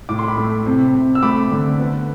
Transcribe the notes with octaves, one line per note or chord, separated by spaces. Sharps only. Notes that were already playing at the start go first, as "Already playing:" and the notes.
A2 D6
C6
B5 D6
A3
C3
C3
E6
A3 B5 D6
D3
B3